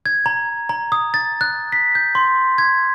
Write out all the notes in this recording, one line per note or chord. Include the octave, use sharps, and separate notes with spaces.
G#6
A#5
A#5
D#6
A6
F#6
B6
G6
C6
G#6